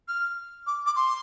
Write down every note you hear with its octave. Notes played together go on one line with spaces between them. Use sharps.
F6
D6
D6
C6